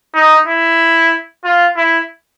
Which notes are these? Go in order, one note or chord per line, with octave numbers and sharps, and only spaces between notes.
D#4
E4
F4
E4